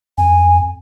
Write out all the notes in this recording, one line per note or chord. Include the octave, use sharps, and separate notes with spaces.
F2 G#5